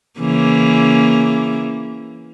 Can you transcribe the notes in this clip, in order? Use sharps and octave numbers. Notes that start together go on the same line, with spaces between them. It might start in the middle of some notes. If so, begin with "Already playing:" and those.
C#3 E3 A#3